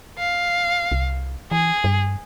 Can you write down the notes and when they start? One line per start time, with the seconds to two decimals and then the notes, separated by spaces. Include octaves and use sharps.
0.18 F5
0.92 C2
1.51 E3 G#4
1.84 G2